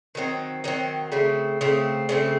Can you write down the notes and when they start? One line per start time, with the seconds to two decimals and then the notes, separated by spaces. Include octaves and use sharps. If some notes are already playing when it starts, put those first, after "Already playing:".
0.15 D#3 F#3 C4
0.64 D#3 F#3 C4
1.12 C#3 A3 C4
1.61 C#3 A3 C4
2.09 C#3 A3 C4